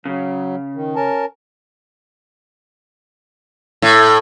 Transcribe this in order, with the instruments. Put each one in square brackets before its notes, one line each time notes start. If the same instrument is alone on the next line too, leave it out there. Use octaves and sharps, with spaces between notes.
[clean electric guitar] C#3 [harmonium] F#3
[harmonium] D#3
C#4 A#4 A5
[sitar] A2